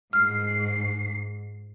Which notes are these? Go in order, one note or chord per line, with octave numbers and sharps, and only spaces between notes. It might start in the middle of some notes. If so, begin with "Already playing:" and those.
G#2 F6 C7